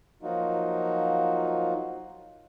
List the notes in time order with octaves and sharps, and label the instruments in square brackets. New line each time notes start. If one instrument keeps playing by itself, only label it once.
[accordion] F3 F#3 A#3 D#4 F4 F#4